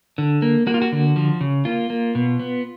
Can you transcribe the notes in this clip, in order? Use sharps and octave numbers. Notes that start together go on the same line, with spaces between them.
D3
A#3
A#3 F#4
F4
F#4
D3
F3
C#3
A#3 F4
A#3
B2
B3